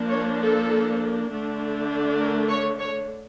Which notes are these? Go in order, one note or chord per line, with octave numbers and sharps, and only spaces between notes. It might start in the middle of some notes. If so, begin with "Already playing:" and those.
Already playing: F3 A#3 D4
C#5
A4
D3 A3 D4
A#4
C#5
C#5